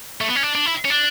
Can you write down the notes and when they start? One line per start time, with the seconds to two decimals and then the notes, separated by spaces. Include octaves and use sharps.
0.21 A3
0.28 B3
0.36 C#4
0.43 D4
0.55 D4
0.66 E4
0.85 C#4
0.90 D4